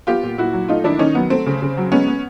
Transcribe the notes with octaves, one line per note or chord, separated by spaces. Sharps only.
B3 F4 G4
A#2
A#2 E4 F#4
F#3
A3 D#4 F4
D#3 D4 E4
D#3 C#4 D#4
F#3 B3
A3 C4
C#3
C#3
F#3
G#3 B3 C#4
B3